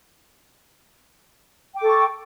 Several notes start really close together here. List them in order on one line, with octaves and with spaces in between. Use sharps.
G5 D6 A4 C#6